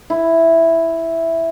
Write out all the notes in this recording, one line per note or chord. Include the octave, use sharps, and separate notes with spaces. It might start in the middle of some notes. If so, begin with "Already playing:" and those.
E4